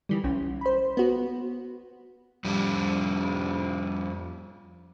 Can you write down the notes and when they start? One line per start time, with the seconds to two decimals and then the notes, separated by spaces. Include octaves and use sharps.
0.09 D#3 E3 G3
0.24 B1 C#4
0.61 C5 B5
0.97 B3 F#4
2.44 F2 G3